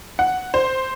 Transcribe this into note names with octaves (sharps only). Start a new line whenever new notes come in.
F#5
C5